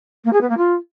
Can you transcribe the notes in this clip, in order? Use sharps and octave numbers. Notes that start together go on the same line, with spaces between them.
A#3
G#4
B3
A#3
F4